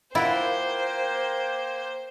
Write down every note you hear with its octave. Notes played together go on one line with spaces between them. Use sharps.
A#3 E4 F4 A#4 C5 F#5 G5